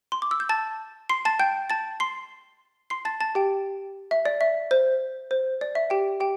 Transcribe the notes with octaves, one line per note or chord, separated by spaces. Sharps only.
C6
D6
E6
G6
A5 A6
C6 C7
A5 A6
G5 G6
A5 A6
C6 C7
C6 C7
A5 A6
A5 A6
G4 G5
E5
D5
E5
C5
C5
D5
E5
G4 G5
G4 G5